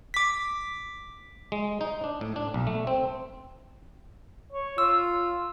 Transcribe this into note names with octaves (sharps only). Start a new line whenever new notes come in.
D6 B6
G#3
D#4
D4
A2
D4
B1
A3
C4
C#5
F4 E6